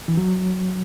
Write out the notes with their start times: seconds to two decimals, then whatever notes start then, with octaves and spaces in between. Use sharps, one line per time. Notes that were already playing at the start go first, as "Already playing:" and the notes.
0.08 E3
0.17 F#3